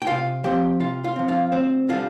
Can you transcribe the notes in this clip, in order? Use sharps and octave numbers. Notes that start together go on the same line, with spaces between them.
G5
C3 F4 F5
F3 C4 G4 G5
C3 F4 F5
F4 F5
F3 C4
F4 F5
D2 C4 C5
D3 G3 F4 F5